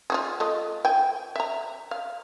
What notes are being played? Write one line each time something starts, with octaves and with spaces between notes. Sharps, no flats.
F4 F#4 G#4
A3 F4 D#5
G5 G#5
E5 A#5
F5